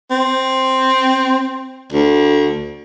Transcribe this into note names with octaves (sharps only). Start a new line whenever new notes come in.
C4
D2